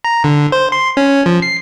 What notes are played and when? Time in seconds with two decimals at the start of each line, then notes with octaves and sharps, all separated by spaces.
0.05 A#5
0.24 D3
0.52 C5
0.72 C6
0.97 C#4
1.26 F3
1.42 C7